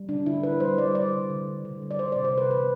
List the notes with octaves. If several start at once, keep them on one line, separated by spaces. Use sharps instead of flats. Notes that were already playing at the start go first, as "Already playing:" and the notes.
Already playing: G3
D3 D4
D3 E4
D3 B4
G3 C5
G3 D5
G3 D5
D3
D3
D3
D3
G3
D5
G3 C5
C3 D5
C5
C3 B4
E3 B4